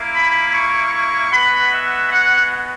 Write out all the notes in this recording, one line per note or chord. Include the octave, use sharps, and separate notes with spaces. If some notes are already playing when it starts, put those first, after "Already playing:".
Already playing: A#3 E4
B5
C#6
C#6
G#3 B3 F#4 B5
E5
F#5